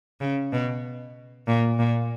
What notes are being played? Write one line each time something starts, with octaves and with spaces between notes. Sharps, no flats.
C#3
B2
A#2
A#2